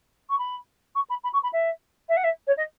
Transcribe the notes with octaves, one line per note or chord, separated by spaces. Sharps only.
C#6
B5
C#6
B5
B5
C#6
B5
E5
E5
F#5
E5
C#5
D#5